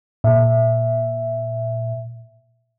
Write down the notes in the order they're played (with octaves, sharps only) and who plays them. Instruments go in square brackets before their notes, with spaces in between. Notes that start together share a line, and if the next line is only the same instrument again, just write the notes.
[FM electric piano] A#2 E5